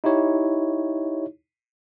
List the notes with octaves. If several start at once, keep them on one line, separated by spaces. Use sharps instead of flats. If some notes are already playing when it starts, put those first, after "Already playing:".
D#4 E4 G4 C#5